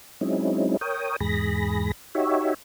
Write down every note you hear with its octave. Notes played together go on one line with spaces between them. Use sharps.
F#3 G#3 C4 C#4 D#4 E4
A#4 C#5 G5 D#6
E2 G#2 G#4 B5 A#6
D#4 F#4 G4 C#5 E5